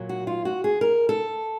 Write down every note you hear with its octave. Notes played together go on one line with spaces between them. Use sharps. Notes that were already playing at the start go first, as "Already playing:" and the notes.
Already playing: A#2 F#3
F#4
F4
F#4
G#4
A#4
A4